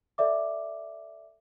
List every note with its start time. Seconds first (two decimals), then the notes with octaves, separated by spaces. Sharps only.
0.18 A4 D5 E5 D6